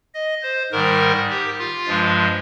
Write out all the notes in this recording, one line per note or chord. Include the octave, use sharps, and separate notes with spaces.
D#5
C5
G#2 D#3 G3 A#4
G4
F4
G2 F3 G#3